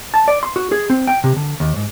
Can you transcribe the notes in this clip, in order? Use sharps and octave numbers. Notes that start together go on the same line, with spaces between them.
A5
D5
C6
F#4
G#4
C4
G5
C3
D3
D#2
G#2